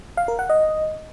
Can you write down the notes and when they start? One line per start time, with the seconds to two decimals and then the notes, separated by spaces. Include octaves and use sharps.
0.17 F5
0.28 A#4
0.39 F#5
0.50 D#5